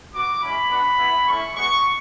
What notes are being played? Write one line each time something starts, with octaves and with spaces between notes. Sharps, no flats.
B3 F#4 D6
G#3 C#4 E4 B5
B3 D4 F#4
B3 E4
A3 C#4 E4 C#6
G#3 B3 F#4 C#6